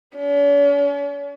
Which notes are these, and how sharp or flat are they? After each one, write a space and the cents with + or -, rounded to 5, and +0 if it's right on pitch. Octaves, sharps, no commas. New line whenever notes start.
C#4 +45